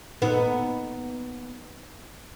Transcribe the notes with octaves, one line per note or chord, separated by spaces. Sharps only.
A#2 B3 D#4 F#5